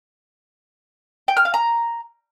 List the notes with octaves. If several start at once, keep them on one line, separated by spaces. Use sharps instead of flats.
G5
F6
F5
A#5